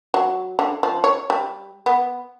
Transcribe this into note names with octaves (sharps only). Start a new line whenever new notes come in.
F#3
D3
F3
C#5
G3
B3